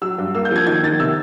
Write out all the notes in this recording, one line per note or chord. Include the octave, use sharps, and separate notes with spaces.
F#3 E6
G2
A#3 E6
G6
F3 G#6
D#3 G#6
D#3 A6
C3 E6